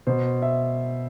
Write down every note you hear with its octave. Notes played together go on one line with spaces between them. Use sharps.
B2 C5
E5